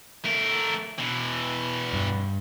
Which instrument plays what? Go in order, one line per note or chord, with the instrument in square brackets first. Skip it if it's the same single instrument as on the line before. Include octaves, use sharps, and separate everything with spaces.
[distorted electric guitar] A3 A#4
B2 E3
[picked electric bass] G2